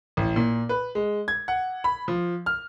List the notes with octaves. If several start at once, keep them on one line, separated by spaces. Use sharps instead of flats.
A1
A#2
B4
G#3
G#6
F#5
B5
F3
F6